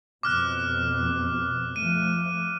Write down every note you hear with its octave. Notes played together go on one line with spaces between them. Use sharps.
F2 B2 D6 F6 F#6
F3 A3 D#7